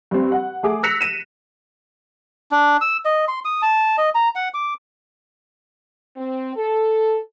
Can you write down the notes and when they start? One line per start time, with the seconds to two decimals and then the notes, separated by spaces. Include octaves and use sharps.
0.11 G2 C4
0.32 F#5
0.63 A3 G#4 D6
0.83 E6 F#6 A#6 B6 C#7 F7
1.01 D#7 E7
2.51 D4
2.81 E6
3.05 D#5
3.28 C6
3.45 D#6
3.62 A5
3.98 D#5
4.15 A#5
4.35 F#5
4.54 D6
6.17 C4
6.57 A4